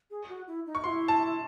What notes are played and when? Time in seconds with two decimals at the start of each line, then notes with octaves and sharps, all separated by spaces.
0.11 G#4
0.29 F#4
0.47 E4
0.66 D#4
0.75 C#6
0.84 E4 F#4 C6
1.08 A5